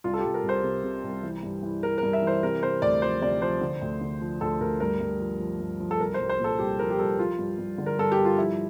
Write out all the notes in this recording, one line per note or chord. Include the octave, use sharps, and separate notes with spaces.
C2 F4
A4
G4
C2
A#4
C2
C5
C3
C3
C2
E3
G2
E3
E3 A#4
G2 A#4
E5
E3 C5
C3 A#4
C3 C5
D2 D5
F3 C5
C3 D5
F3 C5
D3
D2
D3
F3
D2 A4
D2 A#4
G2 A#4
G2
F3
F3
G2
F3
A4
C2 A#4
C5
C2
C5
A#2
A4
C2 G4
F3 A#4
G4
C2 A4
F3 F4
G2
G2
D3
A#4
G2 A4
G4
G2
F4
F3 E4